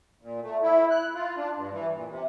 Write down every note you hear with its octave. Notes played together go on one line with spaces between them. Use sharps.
A#2
A3
E4
F#6
F4
D4
G2
E3
A#2
C3